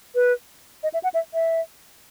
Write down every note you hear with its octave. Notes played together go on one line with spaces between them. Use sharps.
B4
D#5
E5
F#5
E5
E5